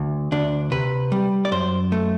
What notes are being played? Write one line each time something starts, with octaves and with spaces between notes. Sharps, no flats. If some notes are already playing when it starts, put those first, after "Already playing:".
Already playing: D2
D2 D4
C3 B4
G3
D5
F#2 C5
A3